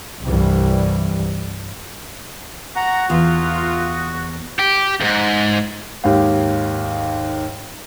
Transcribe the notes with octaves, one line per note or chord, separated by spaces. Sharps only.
C2 G2 E3 G3
F#4 F#5 A#5
E2 E4 F4 D#6
G4
D2 G#2
D#2 G#2 G4 F5